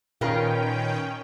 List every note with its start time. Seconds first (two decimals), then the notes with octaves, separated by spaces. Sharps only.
0.21 A#2 D#3 C#4 F4 A#4 B4 G5